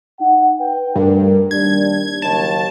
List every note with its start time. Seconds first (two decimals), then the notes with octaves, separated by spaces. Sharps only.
0.20 D#4 F#5
0.59 B4 G5
0.95 D2 G2 A#4
1.51 D#2 G3 D4 G#6
2.22 F#1 D#2 A5